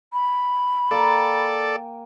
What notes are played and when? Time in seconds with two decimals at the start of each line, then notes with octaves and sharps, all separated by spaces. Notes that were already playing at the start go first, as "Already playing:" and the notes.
0.13 B5
0.91 A#3 A4 D5 G5 G#5